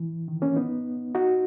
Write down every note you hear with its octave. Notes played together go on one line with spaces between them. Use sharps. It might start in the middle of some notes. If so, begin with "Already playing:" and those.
Already playing: E3
D#3
A#3 C#4
B3 D#4
D#4 F#4